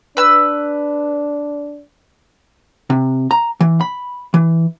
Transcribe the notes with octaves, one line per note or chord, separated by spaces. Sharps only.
D4 B4 E6
C3
A#5
E3
B5
E3